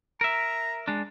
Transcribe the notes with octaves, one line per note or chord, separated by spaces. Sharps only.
A#4 E5 A#5
G#3 D4